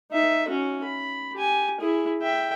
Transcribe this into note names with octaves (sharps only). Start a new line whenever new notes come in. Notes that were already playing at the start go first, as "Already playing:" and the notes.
D#4 E5
C#4 F#4
B5
G4 G#5
E4 G#4
E5 G5